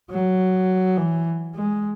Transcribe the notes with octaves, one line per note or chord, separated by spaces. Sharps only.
F#3
E3
G#3